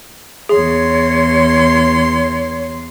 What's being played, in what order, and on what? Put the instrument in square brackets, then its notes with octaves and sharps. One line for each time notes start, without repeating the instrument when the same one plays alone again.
[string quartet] E2 C6 [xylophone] G#4 [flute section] C#5